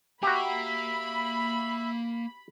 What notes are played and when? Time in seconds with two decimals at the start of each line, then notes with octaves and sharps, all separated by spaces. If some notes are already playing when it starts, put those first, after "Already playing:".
0.23 A#3 F#4 G4 E5 A#5 B5